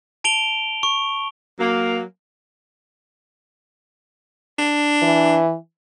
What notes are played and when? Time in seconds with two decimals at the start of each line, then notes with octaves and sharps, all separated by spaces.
0.24 A5 D7 F7 G7
0.83 C#6
1.59 F#3 A#3
4.58 D4
5.02 E3